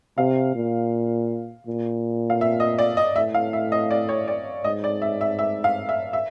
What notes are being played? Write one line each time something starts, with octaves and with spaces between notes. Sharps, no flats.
C3 F5
A#2
A#2
F5
E5
D#5
D5
D#5
A2 E5
F5
E5
D#5
D5
C#5
D5
G#2 D#5
D5
E5
E5
E5
F5
E5
E5